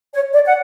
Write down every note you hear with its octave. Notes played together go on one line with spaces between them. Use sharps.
C#5
D5
F#5